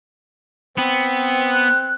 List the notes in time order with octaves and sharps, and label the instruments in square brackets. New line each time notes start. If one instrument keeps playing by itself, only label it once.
[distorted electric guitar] B3 [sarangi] C4
[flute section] F#6